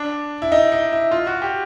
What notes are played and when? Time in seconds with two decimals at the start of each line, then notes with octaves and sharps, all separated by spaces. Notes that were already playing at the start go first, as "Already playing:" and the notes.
Already playing: D4
0.42 E4
0.52 D#4
0.72 D#4
0.92 E4
1.11 F4
1.27 F#4
1.42 G4